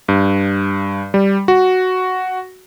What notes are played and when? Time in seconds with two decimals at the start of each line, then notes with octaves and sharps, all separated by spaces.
0.09 G2
1.14 G3
1.48 F#4